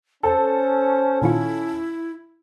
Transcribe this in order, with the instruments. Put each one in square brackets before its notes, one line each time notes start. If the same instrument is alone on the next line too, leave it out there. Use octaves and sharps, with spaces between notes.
[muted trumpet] C#4 [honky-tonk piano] A4 [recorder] C5
[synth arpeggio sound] A#2 D#3 F4 [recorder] E4